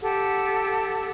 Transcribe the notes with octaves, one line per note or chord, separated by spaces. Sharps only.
G4 A4 F#5